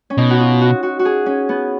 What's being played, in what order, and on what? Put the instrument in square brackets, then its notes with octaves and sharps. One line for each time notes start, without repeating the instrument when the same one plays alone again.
[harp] C#4
[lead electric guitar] B2 [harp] D#4
[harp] F#4
F4
F#4
F#4
F#4
G#4
C#4
B3